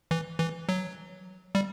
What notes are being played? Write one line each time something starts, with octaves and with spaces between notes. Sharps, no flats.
E3
E3
F#3
G3